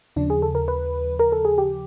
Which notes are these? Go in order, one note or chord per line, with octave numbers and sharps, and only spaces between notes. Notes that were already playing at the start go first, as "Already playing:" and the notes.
D#2 C#3 F3 D4
G#4
A4
A#4
B4
A#4
A4
G#4
G4